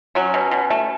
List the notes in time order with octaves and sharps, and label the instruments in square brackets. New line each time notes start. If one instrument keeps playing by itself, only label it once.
[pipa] F#3 C#4
B2
B2
A3